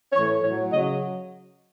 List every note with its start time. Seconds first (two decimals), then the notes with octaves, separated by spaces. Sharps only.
0.13 E3 C#5
0.18 A2
0.42 A2 F#3 C#5
0.71 C#3 F#3 D#5